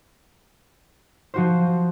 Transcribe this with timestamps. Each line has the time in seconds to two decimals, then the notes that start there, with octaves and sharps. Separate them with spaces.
1.34 F3 F#4 C5